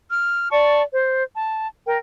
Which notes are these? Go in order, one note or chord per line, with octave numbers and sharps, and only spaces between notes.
F6
D5 A5 C#6
C5
A5
A#4 G5